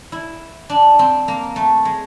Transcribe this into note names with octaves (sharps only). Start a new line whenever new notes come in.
E4
D4
C4
A#3
A3
G#3